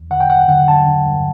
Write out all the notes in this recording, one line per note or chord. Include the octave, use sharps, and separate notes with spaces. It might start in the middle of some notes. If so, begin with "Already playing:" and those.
Already playing: E2
D3 F#5
G5
G2 F#5
D3 F#5
D3 A5
D3
G2